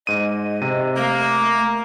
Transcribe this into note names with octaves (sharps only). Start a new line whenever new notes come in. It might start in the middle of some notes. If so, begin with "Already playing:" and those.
G#2 D#5 D#7
C3 D#7
A3 A#3